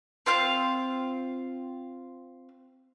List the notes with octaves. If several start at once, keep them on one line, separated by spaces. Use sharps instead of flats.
C4 F4 F5